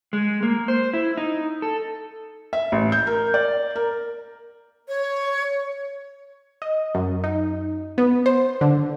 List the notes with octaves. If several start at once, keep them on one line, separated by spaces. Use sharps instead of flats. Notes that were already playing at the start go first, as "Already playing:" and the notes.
G#3
A#3
C5
E4
D#4
A4
E5
A1
G6
A#4
D5
A#4
C#5
D#5
F#2
D#4
B3
C5
D3